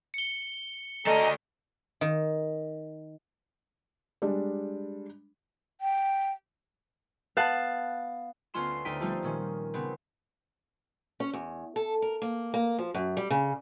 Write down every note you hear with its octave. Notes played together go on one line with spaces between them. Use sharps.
C#7 G7
A3 A4 D5 D#5 G#5 A#5
D#3
G3 G#3 D4
G5
B3 F5 A5 F#6
D2 B3 C#4 F4 C6 E7
D2 D#4 C5 G5 B6 D#7
F3 G3 A3 C4 D#4 F4
A#2 D#3 C#4
C#3 B3 C4
C#4
E2
A4
A#4
A#3
A#3
F3
F#2
G3
C#3